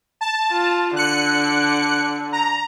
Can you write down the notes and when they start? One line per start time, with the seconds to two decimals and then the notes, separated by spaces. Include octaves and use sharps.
0.21 A5
0.51 F4
0.96 D3 F#6 C#7
2.33 A#5